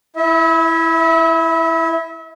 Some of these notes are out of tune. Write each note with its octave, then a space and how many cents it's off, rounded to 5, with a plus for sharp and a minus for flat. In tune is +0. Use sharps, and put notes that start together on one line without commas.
E4 +0 E5 -35